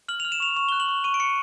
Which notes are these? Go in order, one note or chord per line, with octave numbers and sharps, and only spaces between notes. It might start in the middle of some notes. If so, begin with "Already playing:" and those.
F6 F#7
F6 F7
E7
C#6 F7
C#6 F7
F#6 G7
F#7
C#6
C#6 D#7
D7
C#6 C#7